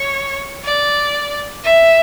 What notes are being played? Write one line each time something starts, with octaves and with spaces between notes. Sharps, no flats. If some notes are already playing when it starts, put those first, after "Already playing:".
Already playing: C#5
D5
E5